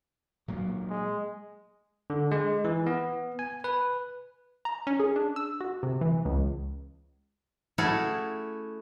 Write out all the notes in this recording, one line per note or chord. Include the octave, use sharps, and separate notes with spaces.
A#2 F#3 A#3
G#3
D3
G#3
E3
B3
G#5
B4
A#5
C#4
G#4
D4
E6
F#4
C3
E3
C#2
A3 C#4 E4 F#4 G#4 A4